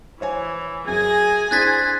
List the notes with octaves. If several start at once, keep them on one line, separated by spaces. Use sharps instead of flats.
E3 C5 C#5 G#5
F#2 G#4 G#5 A#6
D4 E4 G#4 C5 F#6 A6 B6